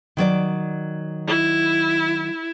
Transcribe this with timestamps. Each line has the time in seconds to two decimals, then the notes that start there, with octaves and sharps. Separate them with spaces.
0.17 D#3 F#3 D5
1.28 E4